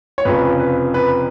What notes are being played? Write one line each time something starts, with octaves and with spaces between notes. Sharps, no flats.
C#5
F1 F2 C#3 F3 B4
B4
B4